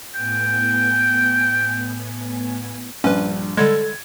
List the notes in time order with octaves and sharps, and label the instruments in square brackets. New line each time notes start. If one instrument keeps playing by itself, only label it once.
[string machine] A2 B3 G#5 [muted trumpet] G5
[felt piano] A#1 G2 [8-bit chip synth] C#4 B4
[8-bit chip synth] D3 G3 G#3 [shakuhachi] A4 [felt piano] G#6